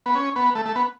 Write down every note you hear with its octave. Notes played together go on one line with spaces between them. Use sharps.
B3
C#4
B3
A3
A3
B3